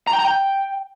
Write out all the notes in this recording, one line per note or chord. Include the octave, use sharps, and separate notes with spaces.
A#5
G5
A#5
G5